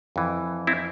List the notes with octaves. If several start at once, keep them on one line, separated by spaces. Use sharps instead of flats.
F2 E3
C4 E4